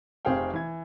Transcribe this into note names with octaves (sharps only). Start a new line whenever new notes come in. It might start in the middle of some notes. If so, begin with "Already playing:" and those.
F1 C3 G#4 C5 F5 G5
E3 G#6